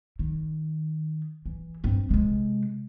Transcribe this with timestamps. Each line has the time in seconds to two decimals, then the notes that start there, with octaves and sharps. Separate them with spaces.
0.19 D#3
1.46 E3
1.84 G2 C4
2.11 C3 G#3